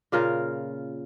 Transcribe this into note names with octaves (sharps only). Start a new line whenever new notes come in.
A#2 C#3 F4 A#4